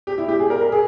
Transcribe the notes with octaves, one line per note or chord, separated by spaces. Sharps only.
G4
E4
G4
G#4
A#4
A#4
G#4